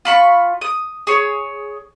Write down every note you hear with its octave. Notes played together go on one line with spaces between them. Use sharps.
F4 B5 C#6
D#6
G#4 C#5